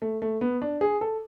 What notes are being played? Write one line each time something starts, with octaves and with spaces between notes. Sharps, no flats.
A3
A3
B3
D4
G#4
A4